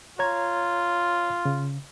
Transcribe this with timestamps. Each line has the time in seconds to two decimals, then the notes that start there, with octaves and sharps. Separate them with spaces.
0.19 F4 C#5 A#5 G#6
1.45 C#3